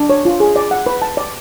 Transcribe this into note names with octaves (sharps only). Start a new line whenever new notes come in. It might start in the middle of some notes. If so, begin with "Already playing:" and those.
Already playing: D4
C#5
F4
G#4
D5
F#5
B4
A5
D5